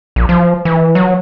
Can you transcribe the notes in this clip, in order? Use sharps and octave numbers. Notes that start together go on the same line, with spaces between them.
A#1
F3
E3
F#3